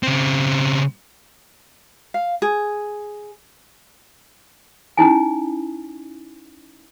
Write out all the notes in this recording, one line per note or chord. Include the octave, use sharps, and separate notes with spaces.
C#3 C4
F5
G#4
C#4 D#4 E4 G#5